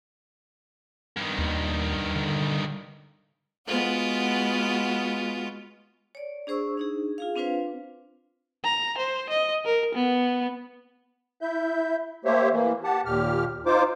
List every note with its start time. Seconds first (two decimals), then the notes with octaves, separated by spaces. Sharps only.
1.17 G2 D#3
1.38 D#2
2.15 D3
3.67 G#3 B3 F4 F#4
6.15 C#5 D5
6.47 D4 G#4 C5 C#6 E6
6.77 D4 D#4 G#4
7.18 F4 G#4 F5
7.36 C4 D4 F4 B4 C5 F5
8.64 A#5
8.98 C5
9.30 D#5
9.65 A#4
9.95 B3
11.41 E4 E5 G6
12.25 A3 A#3 G4 C5 C#5 E5
12.51 E3 A#3
12.84 G4 F#5 A5
13.05 D#2 A#2 G4 F6
13.66 D#4 F4 C5 D6